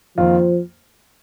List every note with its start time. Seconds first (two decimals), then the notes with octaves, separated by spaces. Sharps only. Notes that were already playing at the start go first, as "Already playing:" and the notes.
0.17 F2 D#3 F3 A#3 F4 A#4